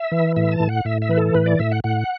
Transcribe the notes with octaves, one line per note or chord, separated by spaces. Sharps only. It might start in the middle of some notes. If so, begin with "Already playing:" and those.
Already playing: E5
E3
A2 E5
A5
A2
F#5
A2 E5
E5
E3 B4
A4
A2 B4
D5
A2 E5
F#5
A2 F#5